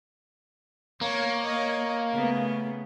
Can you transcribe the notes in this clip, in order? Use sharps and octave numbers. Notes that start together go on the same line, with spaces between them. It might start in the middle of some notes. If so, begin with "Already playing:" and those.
A#3 C#5
C#5 D#5
C#3 A3 B3